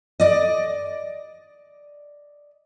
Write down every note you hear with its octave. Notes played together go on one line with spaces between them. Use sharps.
D5 D#5